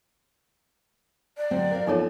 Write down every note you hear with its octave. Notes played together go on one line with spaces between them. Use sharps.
D5
D3 F#3 C4
A#4 F5
F3 B3 D#4 A4 C#5 A5